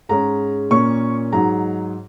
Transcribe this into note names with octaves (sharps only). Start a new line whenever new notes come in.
G#2 G#3 C#4 A#5
A#2 A#3 C#4 C#6
G#2 F#3 D#4 A#5